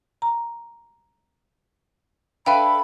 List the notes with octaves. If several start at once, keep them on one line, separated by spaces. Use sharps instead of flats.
A#5
D4 A4 B4 E5 F5 G5 B5